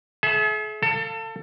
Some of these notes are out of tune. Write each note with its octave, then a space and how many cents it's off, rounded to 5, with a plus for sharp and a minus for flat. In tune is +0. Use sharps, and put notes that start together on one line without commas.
G#4 +45 E5 +0
A4 +25 F5 +0 A5 +30